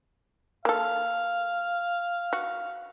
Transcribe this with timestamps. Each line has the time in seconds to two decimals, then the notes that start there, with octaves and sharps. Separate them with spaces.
0.65 A#3 A4 F5
2.33 F#4